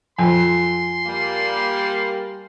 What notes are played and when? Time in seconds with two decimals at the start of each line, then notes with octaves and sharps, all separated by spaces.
0.19 F2 G#5 C6
1.06 G3 A#3